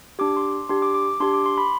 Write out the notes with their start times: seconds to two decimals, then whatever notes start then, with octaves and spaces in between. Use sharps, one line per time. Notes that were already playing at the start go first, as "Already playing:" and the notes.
0.19 D4 G4 D6
0.37 C6
0.53 D6
0.69 D4 G4 C6
0.82 D6
0.94 D6
1.20 D4 G4 C6
1.33 D6
1.46 C6
1.58 B5